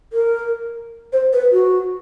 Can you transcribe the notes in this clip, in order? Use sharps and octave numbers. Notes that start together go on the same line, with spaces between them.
A#4
C5
B4
F#4